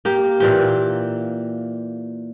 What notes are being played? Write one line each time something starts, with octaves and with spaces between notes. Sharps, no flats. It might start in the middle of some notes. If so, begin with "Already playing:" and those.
A#3 G4
A#2 E3 G4